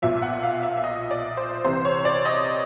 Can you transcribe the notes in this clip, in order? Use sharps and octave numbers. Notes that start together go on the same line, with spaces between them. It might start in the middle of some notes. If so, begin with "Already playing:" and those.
B1 A#2 F3 E5
F#5
F5
E5
E5
D#5
D5
C5
C2 C3 E3 C5
C#5
D5
D#5